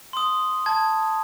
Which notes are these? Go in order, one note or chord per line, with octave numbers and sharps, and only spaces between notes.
C6 D#6
A5 G#6